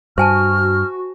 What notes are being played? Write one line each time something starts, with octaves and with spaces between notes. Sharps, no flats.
G2 F#4 C5 G#5 A5 F6